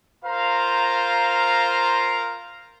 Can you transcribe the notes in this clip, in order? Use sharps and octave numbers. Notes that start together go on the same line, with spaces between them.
F4 A#4 C5 F5 A#5